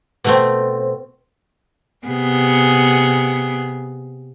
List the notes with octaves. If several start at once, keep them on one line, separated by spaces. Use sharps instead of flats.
B2 A3 C4
C3 B3 G#4